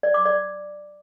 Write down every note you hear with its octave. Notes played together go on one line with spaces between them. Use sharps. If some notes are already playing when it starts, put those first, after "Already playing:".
D5
D6
D5